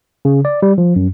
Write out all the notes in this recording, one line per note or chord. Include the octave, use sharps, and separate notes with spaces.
C#3
D5
G3
F3
F#2